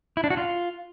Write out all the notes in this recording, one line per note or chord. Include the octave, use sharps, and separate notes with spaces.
E4
D4
F#4
F4